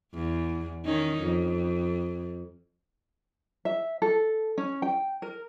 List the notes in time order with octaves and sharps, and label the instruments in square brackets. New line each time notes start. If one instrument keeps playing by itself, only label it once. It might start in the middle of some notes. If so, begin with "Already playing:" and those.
[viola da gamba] E2
D#3 C#4 D#4
F2
[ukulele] E5
A4
C#4
G5
A#4